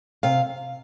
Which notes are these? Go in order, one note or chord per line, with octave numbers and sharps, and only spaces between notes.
C3 F5